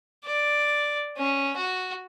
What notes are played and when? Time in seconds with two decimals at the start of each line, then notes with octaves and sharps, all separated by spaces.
0.25 D5
1.17 C#4
1.57 F#4